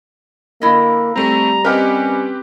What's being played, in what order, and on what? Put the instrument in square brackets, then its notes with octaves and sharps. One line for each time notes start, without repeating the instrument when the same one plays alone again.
[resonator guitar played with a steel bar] D3 E4 D#5 [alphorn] A#3
[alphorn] G3 [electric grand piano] A3 C4 [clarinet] A#5
[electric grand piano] C4 G4 B4 [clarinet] C#4 [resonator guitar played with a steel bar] A#4 D#5